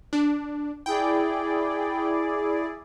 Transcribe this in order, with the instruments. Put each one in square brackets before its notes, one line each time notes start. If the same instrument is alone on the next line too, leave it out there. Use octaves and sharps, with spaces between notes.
[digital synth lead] D4
[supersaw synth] E4 G#4 D5 [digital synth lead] G5